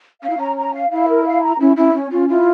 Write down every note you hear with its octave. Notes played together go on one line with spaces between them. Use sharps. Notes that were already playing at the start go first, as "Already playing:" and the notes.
C#4 F5
E4
C#4 A#5
A#5
F5
E4 F5
A#4
F5
A#5
C#4 E4
C#4 E4
C#4
C#4 F4
E4 F4